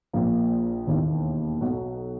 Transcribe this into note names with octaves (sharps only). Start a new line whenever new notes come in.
A#1 A#2 A#3
E1 D#2 D#3 A#3 E4
B1 B2 F#3